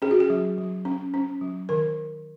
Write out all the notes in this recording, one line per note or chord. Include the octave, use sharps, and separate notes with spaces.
C#4 G#4
F#4
G#4
F#3
F#3
C#4
C#4
F#3
D#3 A#4